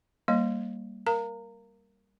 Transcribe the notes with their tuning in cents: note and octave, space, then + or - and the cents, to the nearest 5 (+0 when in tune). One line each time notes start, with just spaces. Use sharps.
G3 +0 A#3 +0 D#5 +0
A#4 +0 F5 -10 A#5 -25